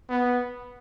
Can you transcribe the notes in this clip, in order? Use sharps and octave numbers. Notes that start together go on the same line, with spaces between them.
B3